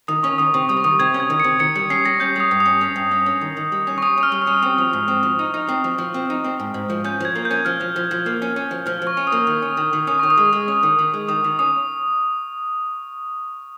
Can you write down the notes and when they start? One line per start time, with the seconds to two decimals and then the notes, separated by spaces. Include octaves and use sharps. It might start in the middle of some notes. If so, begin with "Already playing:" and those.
0.08 D#3 D#6
0.23 C#4 C#6
0.38 D#3 D#6
0.54 C3 C#6
0.69 G3 D#6
0.77 C#6
0.84 D#3 D#6
0.99 C3 G#6
1.14 C#4
1.20 G#6
1.30 D#3
1.40 C3 C#7
1.60 D#3 C#7
1.76 G3 C#7
1.90 C#4 C7
2.05 G3 A#6
2.20 C#4 G6
2.36 G3 D#6
2.51 G2
2.60 D#6
2.66 C#4
2.81 C#4
2.96 G2
3.11 C#4
3.26 C#4
3.41 D#3
3.57 D#3
3.72 G3
3.87 C#4
3.98 C#6
4.02 C#4 D#6
4.18 C#4
4.23 F6
4.32 G3
4.42 C#6
4.47 C#4
4.63 C4 D#6
4.78 F3
4.93 G#2
5.08 C4
5.23 F3
5.39 D#4
5.54 D#4
5.69 C4
5.84 F3
5.98 F3
6.14 C4
6.30 D#4
6.44 C4
6.60 G#2
6.74 G#2
6.90 F3
7.04 C#4 G6
7.21 F3 G#6
7.35 A#3
7.45 G6
7.51 C#4
7.65 F3 F6
7.81 F3
7.96 F3
8.11 F3
8.26 A#3
8.42 C#4
8.56 C#4
8.71 F3
8.87 F3 F6
9.02 F3
9.07 C#6
9.17 C#4
9.27 D#6
9.32 A#3
9.47 D#3
9.62 C#4
9.77 D#3
9.93 D#3
10.07 C#4 D#6
10.19 D#3 C#6
10.30 D#6
10.38 G#3
10.53 G#3
10.68 C#4
10.83 D#3
10.99 D#3
11.14 G#3
11.28 D#3 D#6
11.44 D#3
11.59 C#4 D#6